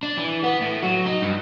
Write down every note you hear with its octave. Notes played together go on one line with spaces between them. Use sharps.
D4
E3
B3
A2
F#3
D#4
G2